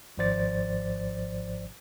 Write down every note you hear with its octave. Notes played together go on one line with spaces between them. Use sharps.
G#1 G#2 F3 C5 D5 A6